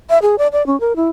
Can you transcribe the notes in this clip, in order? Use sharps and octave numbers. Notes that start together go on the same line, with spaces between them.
E5
G#4
D5
D5
C#4
A#4
E4